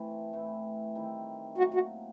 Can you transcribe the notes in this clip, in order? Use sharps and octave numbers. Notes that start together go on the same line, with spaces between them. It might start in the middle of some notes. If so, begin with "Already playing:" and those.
Already playing: A2 E3 A3 C4
A2 E3 A3 C4
D#3 G3 C4 E4
A2 F#3 A#3 F#4
F#4